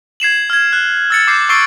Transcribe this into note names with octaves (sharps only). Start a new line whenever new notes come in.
G#6 C7 E7 F#7
F6 G#6
F#6
E6 A6 C#7
D6 G6 C7
C#6 E6 A6 C7 D7 G7